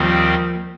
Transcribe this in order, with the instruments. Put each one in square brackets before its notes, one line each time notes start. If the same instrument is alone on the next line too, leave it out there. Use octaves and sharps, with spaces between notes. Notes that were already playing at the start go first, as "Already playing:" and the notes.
Already playing: [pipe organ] D#2 D#3 G3 C4 [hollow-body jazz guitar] F3 A#3